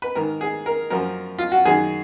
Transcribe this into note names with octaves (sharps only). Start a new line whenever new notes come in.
B4
G#2 D#3 A#4
G#4
A#4
F#2 F3 A#4
F4
F#4
F#2 D#3 G#4